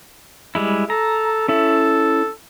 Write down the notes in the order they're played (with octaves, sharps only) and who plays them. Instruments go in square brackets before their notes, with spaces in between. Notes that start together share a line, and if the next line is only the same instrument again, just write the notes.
[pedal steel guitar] G3 G#3 E4
[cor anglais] A4 [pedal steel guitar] A#5
[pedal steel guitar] C#4 E4 [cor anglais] A4